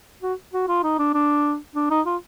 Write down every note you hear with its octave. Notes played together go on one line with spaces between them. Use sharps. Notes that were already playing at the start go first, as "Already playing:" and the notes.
F#4
F#4
F4
D#4
D4
D4
D4
D#4
F4